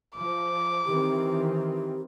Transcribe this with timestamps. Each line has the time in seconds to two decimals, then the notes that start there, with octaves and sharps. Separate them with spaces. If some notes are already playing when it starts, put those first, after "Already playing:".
0.16 F3 D6
0.86 D#3 E3 C4 G4